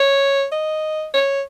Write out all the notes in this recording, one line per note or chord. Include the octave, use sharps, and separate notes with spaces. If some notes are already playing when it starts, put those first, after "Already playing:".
Already playing: C#5
D#5
C#5